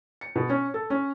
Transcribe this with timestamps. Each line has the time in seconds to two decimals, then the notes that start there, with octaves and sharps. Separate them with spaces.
0.21 C#7
0.35 B2
0.50 C#4
0.74 A4
0.90 C#4